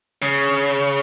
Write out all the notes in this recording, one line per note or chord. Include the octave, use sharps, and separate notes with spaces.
C#3